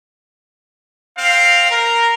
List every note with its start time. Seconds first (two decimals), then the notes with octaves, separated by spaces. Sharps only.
1.17 C4 F5
1.70 A#4